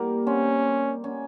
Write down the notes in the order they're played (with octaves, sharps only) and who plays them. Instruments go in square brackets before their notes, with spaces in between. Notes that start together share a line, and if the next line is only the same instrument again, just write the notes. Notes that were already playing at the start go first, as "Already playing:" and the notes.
Already playing: [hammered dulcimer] G3 A#3
[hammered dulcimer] C4 [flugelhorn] C#4
[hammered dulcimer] C#4